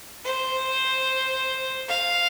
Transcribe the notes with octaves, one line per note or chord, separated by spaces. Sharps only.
C5
F5